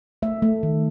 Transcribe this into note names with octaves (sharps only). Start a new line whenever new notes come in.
A3 E5
A3
D#3